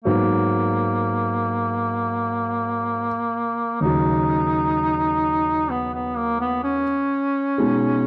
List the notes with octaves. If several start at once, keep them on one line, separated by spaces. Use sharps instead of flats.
G#2 F#3 A#3 B3
D#2 C#3 F#3 D#4
B3
B3
A#3
B3
C#4
B2 G#3 D#4